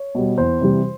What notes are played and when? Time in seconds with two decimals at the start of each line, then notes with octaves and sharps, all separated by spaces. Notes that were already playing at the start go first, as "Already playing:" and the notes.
Already playing: C#5
0.15 B2 G3
0.38 E2 C5
0.61 C3 E3 G3